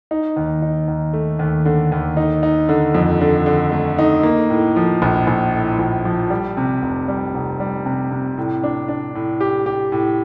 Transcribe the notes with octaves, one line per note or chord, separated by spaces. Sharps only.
D#4
D#2
D#4
D#2
A3
D#2
D3
D#2
D#4
D#4
D3
F2
D3
D3
A3
D#4
A#3
A2
F3
A#1
A#1
A2
A#1
F3
G3
C3
F1
G3
F1
G3
C3
C3
A2
D4
D4
A2
G4
G4
A2